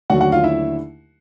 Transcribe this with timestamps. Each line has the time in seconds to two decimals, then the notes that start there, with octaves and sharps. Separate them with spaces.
0.10 D#2 D3 F#3 A3 D4 F#4 F#5
0.21 F#4 F#5
0.32 F4 F5
0.44 E4 E5